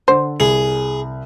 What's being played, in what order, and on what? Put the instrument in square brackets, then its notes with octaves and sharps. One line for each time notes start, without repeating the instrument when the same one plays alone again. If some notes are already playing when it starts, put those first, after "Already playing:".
[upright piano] D3 A4 F#5 [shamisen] C5
[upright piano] C2 [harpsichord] G#4